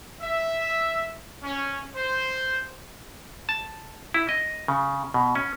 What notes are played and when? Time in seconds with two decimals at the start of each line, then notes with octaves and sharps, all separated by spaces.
0.21 E5
1.44 C#4
1.96 C5
3.49 A5
4.14 E4
4.29 D#5
4.68 C#3
5.14 B2
5.35 C#4